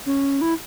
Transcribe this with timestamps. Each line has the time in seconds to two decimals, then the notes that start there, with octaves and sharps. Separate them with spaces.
0.06 C#4
0.41 E4